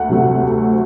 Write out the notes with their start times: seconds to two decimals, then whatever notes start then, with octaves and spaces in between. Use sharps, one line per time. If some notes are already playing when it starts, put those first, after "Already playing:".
Already playing: D2 F#5
0.09 C3 F#3 A3
0.41 D2